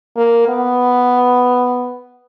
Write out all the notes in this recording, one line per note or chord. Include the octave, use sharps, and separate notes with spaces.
A#3
B3